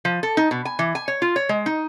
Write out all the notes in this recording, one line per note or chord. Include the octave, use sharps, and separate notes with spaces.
F3
A4
D#4
B2
G#5
E3
G#5
C#5
F4
C#5
G#3
D#4